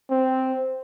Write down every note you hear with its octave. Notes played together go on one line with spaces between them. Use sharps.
C4